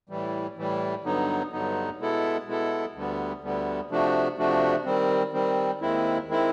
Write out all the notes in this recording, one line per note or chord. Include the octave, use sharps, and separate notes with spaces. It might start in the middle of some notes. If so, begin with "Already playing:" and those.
A2 E3 G3
A2 E3 G3
G2 D3 F#3 B3 D#4
G2 D3 F#3 B3 D#4
B2 G#3 B3 E4 A4
B2 G#3 B3 E4 A4
D2 D3 G3 B3
D2 D3 G3 B3
C3 F3 A3 D4 F#4
C3 F3 A3 D4 F#4
D#3 G3 C4
D#3 G3 C4
D#2 D#3 G#3 C4 E4
D#3 G#3 C4 E4